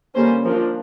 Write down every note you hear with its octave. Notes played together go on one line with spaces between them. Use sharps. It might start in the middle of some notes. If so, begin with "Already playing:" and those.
D3 G3 A#3 C#4 C5
F3 A#3 D4 A#4